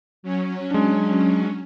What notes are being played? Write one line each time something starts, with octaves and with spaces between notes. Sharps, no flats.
F#3 C#4
G#3 D4